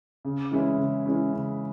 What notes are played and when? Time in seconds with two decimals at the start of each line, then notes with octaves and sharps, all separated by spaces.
0.25 C#3
0.51 E3 G#3 C#4 E4
0.78 C#3
1.05 E3 G#3 C#4 E4
1.32 C#3